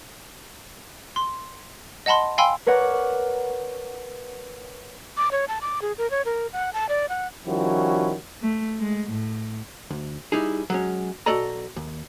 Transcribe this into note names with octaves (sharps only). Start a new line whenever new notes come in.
C6
D#5 F#5 A5 B5 C6
F5 G5 G#5 B5 C6 E6
A#4 B4 C#5 D5 F#5
D6
C#5
A5
D6
G#4
A#4
C#5
A#4
F#5
A5
D5
F#5
D#3 F3 G3 C#4 E4 F#4
A3
G#3
A2
D2
G3 D#4 E4 G#4
F#3 G#3 C#4
B1 F#4 A4 D5 D#5 A#5
D#2